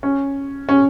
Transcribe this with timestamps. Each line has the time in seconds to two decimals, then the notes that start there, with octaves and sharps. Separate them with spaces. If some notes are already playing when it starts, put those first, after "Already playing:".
0.03 C#4
0.69 C#4